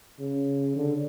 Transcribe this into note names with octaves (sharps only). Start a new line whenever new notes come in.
C#3
D3